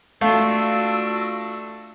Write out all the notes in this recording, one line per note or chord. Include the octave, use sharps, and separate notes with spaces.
A3 D4 F4 F#4 E6